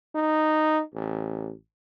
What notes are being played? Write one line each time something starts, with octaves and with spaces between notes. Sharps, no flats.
D#4
A1